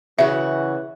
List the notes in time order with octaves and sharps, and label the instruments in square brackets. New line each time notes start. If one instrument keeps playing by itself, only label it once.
[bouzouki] C#3 F#4 [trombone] E3 [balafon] E5